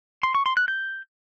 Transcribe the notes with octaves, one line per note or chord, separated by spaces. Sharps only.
C6
C#6
C6
F#6
G6